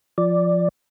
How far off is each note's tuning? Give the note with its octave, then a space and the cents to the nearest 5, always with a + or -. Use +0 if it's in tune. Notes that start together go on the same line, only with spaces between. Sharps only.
F3 +0 D5 +0